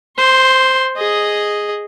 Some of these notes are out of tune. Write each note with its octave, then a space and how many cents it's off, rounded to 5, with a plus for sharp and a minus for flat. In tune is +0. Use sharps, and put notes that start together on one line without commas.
C5 +0 C6 +30
G#4 +0 D#5 +0